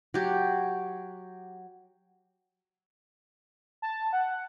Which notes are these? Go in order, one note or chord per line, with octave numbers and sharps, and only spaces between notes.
F#3 G4
A5
F#5